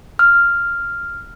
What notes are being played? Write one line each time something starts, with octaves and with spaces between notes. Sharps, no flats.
F6